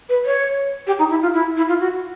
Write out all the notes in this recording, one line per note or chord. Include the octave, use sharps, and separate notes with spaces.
B4
C#5
G4
D#4
E4
F4
E4
E4
F4
F#4